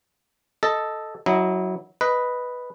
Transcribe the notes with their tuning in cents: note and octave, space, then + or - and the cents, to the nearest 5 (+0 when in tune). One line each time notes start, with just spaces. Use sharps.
A4 +0 D#5 +0
F#3 +0 E4 -25 D#5 +0
B4 +0 D#5 +0